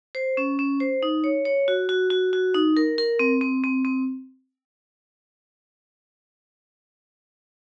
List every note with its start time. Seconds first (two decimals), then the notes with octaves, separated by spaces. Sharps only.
0.15 C5
0.37 C#4
0.59 C#4
0.80 C5
1.03 D#4
1.24 C#5
1.45 C#5
1.68 F#4
1.89 F#4
2.10 F#4
2.33 F#4
2.54 D#4
2.77 A#4
2.98 A#4
3.19 C4
3.41 C4
3.64 C4
3.85 C4